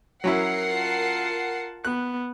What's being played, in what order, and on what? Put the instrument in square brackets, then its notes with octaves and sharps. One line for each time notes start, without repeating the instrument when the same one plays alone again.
[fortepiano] F#3 C#4 E4 [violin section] A#4 F#5 C7
[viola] F4 A5
[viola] B3 [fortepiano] F#6